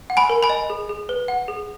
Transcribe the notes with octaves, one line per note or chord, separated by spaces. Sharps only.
F#5
G#5 B5
A#4
G#5 B5
D#5
G#4
G#4
B4
F#5
G#4